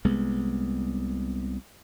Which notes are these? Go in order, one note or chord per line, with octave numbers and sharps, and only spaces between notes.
C2 G#3 B3